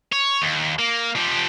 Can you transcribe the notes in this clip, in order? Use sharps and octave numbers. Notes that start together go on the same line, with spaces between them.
C#5
D#2
A#3
F3 G4